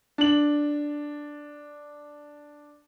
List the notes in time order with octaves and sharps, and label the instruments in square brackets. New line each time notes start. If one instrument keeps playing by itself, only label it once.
[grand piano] D4 F#7